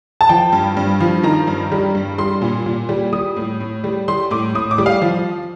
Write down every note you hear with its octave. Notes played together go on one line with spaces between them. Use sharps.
A5
F3 G5
G2
G2
F3
D#3 A#5
G2
G3
G2
G3 C6
A#2
A#2
G3
G3 D#6
A2
A2
G3
G3 C6
A2 D6
A2 D#6
D6
G3
F5
F3